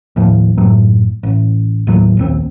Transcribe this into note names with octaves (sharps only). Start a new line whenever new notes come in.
D#2 A2 F3
F#1 A2 F#3
A1
D#2 A2 F#3
A#1 D#2 C4